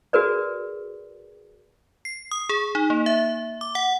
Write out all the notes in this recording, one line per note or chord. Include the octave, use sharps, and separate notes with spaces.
F#4 G#4 A#4 B4 D5
C7
D#6
G#4
D#4
A#3
E5
D6
F#5